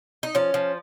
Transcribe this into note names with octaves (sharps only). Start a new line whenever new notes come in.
D#4
F3 C#4
F3